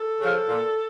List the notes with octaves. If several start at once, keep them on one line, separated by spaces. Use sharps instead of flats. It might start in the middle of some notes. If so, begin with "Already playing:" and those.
Already playing: A4
C#3 F3
A#2